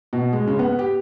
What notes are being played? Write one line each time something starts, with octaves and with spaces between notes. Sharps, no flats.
B2
G#3
C#3
B3
G4